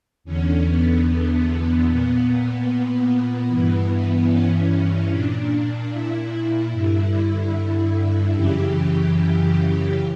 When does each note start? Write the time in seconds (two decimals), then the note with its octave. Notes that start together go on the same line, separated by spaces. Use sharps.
0.24 E2 D3 C#4
0.65 B3
1.06 B3
1.87 A#2 B3
3.48 G2 E3
4.30 C#4
5.10 A#2 D4
5.92 E4
6.72 G2 D3
8.34 F#2 C#3 E3 G4
9.16 G4